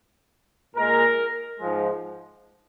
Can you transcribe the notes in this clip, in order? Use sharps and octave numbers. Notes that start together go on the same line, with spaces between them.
A#2 G#3 A#4
G#2 F3 G#3